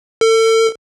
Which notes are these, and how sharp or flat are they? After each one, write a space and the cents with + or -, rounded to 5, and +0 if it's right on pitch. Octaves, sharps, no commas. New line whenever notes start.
A4 +35